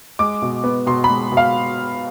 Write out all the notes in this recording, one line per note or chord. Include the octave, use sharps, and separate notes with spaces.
G#3 D6
B2
B3
B2 C6
B5
G#3
B2
F5